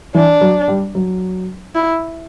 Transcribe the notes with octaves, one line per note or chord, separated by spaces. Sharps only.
E3 D4
F#3
G3
F#3
E4